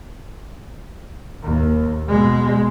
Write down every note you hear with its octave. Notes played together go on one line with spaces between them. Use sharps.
D#2
B2 G#3